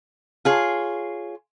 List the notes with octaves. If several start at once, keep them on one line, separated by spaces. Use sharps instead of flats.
F4 G#4 C#5